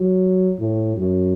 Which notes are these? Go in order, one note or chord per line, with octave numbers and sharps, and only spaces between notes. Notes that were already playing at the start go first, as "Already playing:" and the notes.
Already playing: F#3
A2
F#2